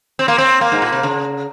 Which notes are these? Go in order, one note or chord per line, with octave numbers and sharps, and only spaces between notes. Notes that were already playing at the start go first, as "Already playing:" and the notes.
C4
A#3
C4
A#3
G#2
A#2
C3
C#3